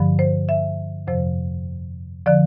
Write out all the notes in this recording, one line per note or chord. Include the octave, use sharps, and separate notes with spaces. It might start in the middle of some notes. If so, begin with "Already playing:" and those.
Already playing: G2 D3 F3
C5
E5
F2 C3 F3 C5
D3 F3 D5